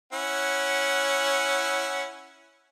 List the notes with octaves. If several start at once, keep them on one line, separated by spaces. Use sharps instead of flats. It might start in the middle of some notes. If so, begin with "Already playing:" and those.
C#4 E4 F#5